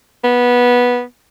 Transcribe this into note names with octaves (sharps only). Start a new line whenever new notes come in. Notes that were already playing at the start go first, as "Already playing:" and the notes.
B3